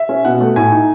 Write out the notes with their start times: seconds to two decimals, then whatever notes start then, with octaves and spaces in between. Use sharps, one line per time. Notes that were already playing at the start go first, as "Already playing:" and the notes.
Already playing: E5
0.09 C#4
0.25 B2 F#5
0.41 A3
0.56 A2 G#5
0.72 D#4